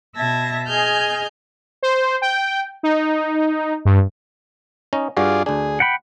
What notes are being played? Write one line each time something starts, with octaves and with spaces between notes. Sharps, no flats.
B2 E5 A5 G#6 A#6
G#4 D#5 G#5 F6 G6
C5
G5
D#4
G2
C#4 D#4 D#5
G2 F4 F#4 G#4 D5
D2 D4 G#4
F#5 G5 B5